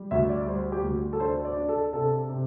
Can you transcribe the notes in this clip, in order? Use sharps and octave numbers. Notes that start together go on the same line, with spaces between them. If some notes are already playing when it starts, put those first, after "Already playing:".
Already playing: G3
D2 E5
D5
G3 C5
G4
D2
A4
D4 C5
D5
D4
A4
C3 A4
C3